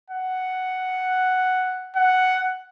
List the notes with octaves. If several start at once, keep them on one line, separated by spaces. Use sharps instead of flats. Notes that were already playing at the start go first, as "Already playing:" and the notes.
F#5
F#5